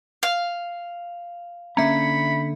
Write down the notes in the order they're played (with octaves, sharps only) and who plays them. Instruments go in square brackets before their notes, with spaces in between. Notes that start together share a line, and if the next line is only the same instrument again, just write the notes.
[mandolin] F5
[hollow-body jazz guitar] D3 A#3 A#5 [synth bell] C#4 E5 C#7 [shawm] B5